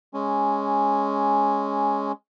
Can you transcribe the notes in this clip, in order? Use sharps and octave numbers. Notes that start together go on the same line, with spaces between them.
G#3 C#4